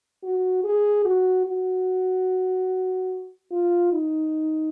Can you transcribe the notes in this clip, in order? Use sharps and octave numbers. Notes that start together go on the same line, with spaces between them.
F#4
G#4
F#4
F#4
F4
D#4